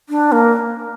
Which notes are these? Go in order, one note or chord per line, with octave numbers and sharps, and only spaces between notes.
D4
A#3